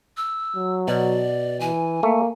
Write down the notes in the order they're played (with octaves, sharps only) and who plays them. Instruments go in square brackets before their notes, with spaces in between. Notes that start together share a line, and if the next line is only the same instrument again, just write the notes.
[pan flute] E6
[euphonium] F#3
[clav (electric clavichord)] B2 [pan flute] D5
[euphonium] E3 [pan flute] G#5
[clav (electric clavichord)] A3 [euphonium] A#3